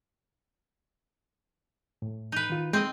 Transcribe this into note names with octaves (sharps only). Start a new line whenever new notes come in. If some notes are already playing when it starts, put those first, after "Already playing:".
A2
D#4 B4
D#3 F4
G#3 C4 D#5